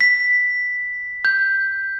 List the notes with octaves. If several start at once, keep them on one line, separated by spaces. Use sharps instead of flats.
B6
G6